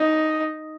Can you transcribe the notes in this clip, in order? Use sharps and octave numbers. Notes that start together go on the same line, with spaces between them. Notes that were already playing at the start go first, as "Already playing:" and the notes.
Already playing: D#4